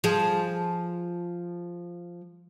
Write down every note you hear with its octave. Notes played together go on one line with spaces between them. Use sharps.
F3 G#4